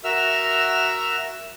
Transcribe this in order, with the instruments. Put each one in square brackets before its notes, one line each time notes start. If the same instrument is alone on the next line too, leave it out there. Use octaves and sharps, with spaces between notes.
[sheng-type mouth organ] F#4 A#4 E5 E6 F6